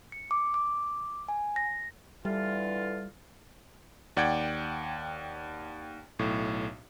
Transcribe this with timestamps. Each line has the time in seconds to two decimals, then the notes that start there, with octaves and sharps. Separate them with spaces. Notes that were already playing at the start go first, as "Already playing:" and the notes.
0.12 C#7
0.31 D6
0.54 D6
1.29 G#5
1.56 A#6
2.25 D3 E3 G3 F4
4.17 D#2 D5 F#5 G5 G#6
6.19 B1 A2